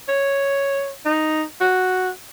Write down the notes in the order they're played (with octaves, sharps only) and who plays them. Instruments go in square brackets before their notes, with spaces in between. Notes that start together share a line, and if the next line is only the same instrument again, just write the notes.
[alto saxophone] C#5
D#4
F#4